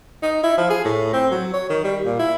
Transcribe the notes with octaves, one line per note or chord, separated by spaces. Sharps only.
D#4
E4
F3
G#4
A2
C4
F#3
C#5
D#3
G3
A#2
E4